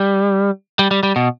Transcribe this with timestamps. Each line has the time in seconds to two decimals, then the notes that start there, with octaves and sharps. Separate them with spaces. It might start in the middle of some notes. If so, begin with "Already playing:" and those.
Already playing: G3
0.79 G3
0.91 G3
1.03 G3
1.16 B2